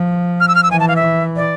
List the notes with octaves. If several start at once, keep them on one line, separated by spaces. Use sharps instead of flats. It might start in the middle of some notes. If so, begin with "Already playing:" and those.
Already playing: F3
F6
E6
F6
E6
E3 G#5
A5
F5
E5
D5